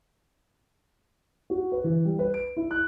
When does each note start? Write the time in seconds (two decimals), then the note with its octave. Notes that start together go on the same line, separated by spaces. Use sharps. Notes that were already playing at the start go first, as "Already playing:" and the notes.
1.50 F#4
1.72 B4
1.84 E3
2.05 G3
2.19 B4
2.34 D7
2.57 E4
2.71 F#6